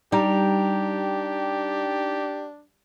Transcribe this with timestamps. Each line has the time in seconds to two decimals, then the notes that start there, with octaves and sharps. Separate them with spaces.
0.12 G3 D4 D#4 G4 G5 A#5